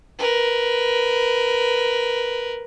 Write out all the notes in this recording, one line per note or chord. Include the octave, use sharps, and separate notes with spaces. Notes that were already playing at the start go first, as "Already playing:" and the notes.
A#4 B4